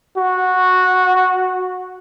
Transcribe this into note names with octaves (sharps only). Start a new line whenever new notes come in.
F#4